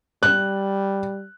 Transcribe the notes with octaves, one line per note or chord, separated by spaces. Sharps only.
G3 F#6